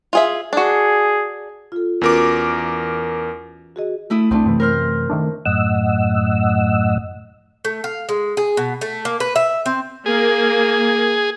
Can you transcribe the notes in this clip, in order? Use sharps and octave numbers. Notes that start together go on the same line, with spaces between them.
F4 G#4 E5
D4 F#4 G#4
F4 A4
E2 C#4 F4 F#4 A#4 D6
E3
F#4 G#4 D#5
A3 E4 D#6
C2 E3 A3 C4 D4
F#2 C3 E3
A#4 C5 F6
D#3 A3 D4
F#2 A2 D#5 F#5 E6
A3
F5
G#3
G#4
B2
A3
A#3
B4
E5
C4
A#3 G#4